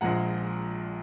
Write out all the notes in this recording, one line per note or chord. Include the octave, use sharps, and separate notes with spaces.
A#1 A#2 F3 G#3 F#5 A#5